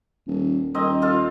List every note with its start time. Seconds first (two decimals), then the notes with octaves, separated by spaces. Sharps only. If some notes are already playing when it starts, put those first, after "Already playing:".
0.27 D#1
0.74 D#1 A#3 C4 D#5
1.02 F4 A4 F5